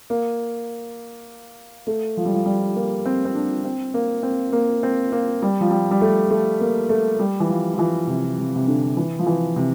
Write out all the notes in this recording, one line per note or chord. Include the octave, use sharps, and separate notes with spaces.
A#3
A3
F3
G3
F3
G3
A#3
C4
C4
D4
C4
A#3
C4
A#3
C4
A#3
G3
F3
G3
G3
A3
A3
A#3
A3
G3
E3
F3
F3
E3
C3
C3
C3
D3
E3
F3
E3
C3